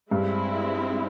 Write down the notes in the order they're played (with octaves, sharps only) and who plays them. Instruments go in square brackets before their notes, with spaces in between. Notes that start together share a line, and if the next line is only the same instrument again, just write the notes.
[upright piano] G2 [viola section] G#3 C4 E4